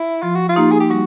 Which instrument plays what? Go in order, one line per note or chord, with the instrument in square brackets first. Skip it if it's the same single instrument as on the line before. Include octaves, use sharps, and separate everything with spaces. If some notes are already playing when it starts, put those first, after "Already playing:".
Already playing: [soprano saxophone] E4
[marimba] F3 [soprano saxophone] F4
[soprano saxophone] F#4
F4
[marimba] A#3 D#4 G4
[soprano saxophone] G#4
G4
[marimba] G3 [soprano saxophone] F#4